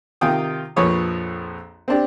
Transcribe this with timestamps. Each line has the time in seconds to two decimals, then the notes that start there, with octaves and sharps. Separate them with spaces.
0.21 C3 D#3 F4 G5 D#6
0.76 A#1 F2 F3 B4 C#5 D#6
1.88 C4 D4 G4